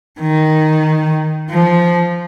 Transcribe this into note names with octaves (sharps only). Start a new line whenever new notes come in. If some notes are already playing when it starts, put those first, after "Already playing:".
D#3
F3